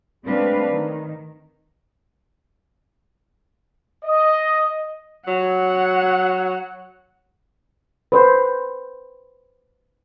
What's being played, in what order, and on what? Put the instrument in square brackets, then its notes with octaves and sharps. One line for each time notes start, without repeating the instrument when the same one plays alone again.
[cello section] G#3 A3 C4 D4 B4 F5
D#3
[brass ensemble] D#5
[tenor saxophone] F#3 [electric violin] F#5
[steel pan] B4 C5